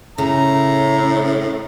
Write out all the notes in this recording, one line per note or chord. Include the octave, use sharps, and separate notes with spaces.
A2 C#3 C#4 A#5